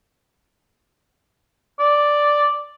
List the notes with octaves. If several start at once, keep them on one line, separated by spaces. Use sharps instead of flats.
D5